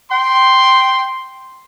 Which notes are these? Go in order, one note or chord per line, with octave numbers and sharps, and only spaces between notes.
G5 C6